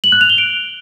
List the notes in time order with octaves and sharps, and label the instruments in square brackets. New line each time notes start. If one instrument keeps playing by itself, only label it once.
[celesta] F#7
F#6
F7
G7
D7